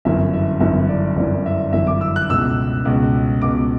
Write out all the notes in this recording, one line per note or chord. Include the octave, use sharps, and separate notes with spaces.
G1 F#2 E3 E5
E5
G1 F#2 E3 E5
D5
G1 F#2 E3 D5
E5
G1 F#2 E3 E5
D6
E6
F#6
C#2 B2 E6
C#2 B2
C#2 B2 D6